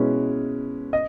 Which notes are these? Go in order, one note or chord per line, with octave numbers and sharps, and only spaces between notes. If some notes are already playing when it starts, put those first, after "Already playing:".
Already playing: B2 G#3 C#4 E4 B4
D#5